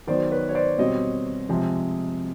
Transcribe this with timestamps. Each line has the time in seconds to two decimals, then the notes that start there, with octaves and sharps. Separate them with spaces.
0.07 D#3 F#3 B3 C5 D5
0.31 B4 C#5
0.49 C#5
0.55 C5 D5
0.78 B2 G3 C4 C#5 D#5
1.49 C3 F3 G#3